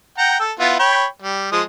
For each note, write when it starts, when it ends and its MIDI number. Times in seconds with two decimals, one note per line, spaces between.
0.18 0.39 78
0.18 0.39 79
0.18 0.39 82
0.40 0.52 69
0.40 0.52 88
0.59 0.75 59
0.59 0.75 64
0.59 0.75 65
0.79 1.05 73
0.79 1.05 79
0.79 1.05 83
1.22 1.48 55
1.52 1.62 53
1.52 1.62 56
1.52 1.62 87